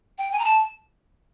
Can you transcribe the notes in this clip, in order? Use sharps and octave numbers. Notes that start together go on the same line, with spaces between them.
G5
G#5
A#5
A5